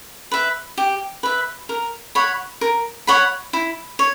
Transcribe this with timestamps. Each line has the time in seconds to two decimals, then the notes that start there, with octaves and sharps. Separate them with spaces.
0.31 B4 E5
0.78 G4
1.23 B4 E5
1.69 A#4
2.15 C#5 F#5 B5
2.61 A#4
3.07 C#5 F#5 B5
3.53 E4
3.99 C#5